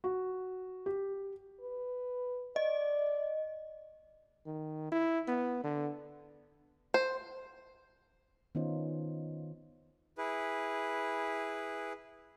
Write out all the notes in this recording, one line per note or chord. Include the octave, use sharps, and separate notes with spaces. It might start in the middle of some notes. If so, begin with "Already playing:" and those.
F#4
G4
B4
D5 D#5
D#3
E4
B3
D3
C5
D#3 B3 C#4 D#4 F4 C5
E4 G#4 B4